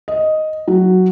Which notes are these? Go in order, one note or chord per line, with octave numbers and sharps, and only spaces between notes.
D#5
F#3